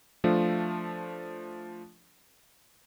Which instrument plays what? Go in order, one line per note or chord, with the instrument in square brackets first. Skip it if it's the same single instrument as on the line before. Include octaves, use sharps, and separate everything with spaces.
[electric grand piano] F3 A3 D4 F4